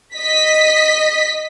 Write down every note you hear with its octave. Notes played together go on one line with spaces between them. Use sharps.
D#5 B6